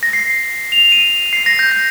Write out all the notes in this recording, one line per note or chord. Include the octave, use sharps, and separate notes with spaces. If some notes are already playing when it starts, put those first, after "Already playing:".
A#6
C7
F7
D#7
C7
A#6
G6
A#6